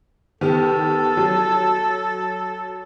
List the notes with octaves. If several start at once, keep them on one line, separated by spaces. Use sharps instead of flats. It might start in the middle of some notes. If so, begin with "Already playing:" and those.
D#3 B3 G4 A4
F#3